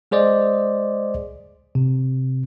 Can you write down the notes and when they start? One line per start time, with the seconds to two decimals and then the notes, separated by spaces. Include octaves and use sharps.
0.11 G#3 G#4 C5 D5 D#5
1.75 C3